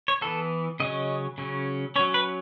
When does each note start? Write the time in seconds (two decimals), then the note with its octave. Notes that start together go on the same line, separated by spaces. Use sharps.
0.08 C#5
0.21 E3 B3 A4
0.80 C#3 F#3 C#4 D#5
1.38 C#3 F#3 C#4
1.96 C#4 C#5
1.99 F#3
2.14 B4